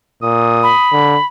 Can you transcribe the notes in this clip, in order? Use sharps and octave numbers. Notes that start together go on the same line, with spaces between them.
A#2 D#6
B5
D3